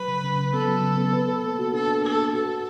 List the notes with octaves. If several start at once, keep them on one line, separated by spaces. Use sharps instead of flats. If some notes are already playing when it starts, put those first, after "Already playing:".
Already playing: F#3 B4
C#3
C#3
C#3
B3 A4
F#3
C#3
B3
B4
B4
A#3
F#4
D4 A4
D4
A#3 A4
B4
F#4 A4
F#4